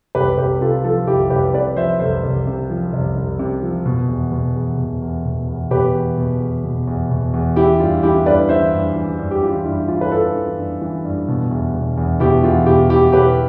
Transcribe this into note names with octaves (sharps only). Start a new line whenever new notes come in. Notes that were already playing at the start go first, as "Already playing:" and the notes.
C2 G4 B4
C2 G4 B4
C3 F4 A4
F3 F4 A4
C2 E4 G4
C2 G4 B4
C3 B4 D5
F3 C5 E5
C2 A4 C5
C2
C3
F3
C2
C2
C3
F3
B2
E2
B2
E2
B2
E2
B2
E2
B2 G4 B4
E2
B2
E2
B2
E2
B2
E2
E3 E4 G4
G2 F4
E3 E4 G4
G2 B4 D5
E3 C5 E5
G2
E3
G2
G4
E3 F4
G2 E4
E3 F4
B4
G2 F4 A4
E3
G2
E3
G2
B2
E2
B2
E2
B2 E4 G4
E2 F4
B2 E4 G4
E2 E4 G4
B2 G4 B4